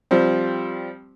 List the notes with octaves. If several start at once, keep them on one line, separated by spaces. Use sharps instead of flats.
F3 G3 C4